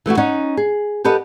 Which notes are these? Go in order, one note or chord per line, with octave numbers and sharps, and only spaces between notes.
E3 A3 E4 F#4
C#4 D#4 C#5 F#5
G#4
G4 A4 B4 D#5 F#5